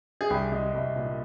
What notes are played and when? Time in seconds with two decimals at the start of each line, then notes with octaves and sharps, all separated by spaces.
0.21 G#4
0.30 C2 G4
0.52 G#3
0.74 C2
0.96 A#2